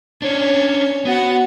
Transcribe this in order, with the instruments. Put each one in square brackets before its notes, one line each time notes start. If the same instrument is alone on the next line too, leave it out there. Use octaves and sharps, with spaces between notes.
[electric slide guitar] C#4 D4 [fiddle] C#5
[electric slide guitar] B3 [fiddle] F#4 F#5